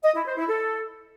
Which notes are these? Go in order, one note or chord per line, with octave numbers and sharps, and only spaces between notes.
D#5
E4
C5
E4
A4